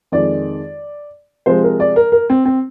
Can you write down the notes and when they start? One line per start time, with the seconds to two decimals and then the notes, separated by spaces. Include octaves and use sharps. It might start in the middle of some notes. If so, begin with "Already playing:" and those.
0.12 F2 D#3 G#3 D5
1.46 C3 F3 G#3 C5
1.63 A#4
1.80 D5
1.96 A#4
2.12 A#4
2.30 C4
2.45 C4